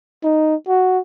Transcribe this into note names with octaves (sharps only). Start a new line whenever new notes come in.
D#4
F#4